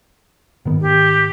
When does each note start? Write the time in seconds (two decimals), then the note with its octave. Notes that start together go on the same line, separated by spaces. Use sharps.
0.65 G#2 D#3 B3
0.81 G4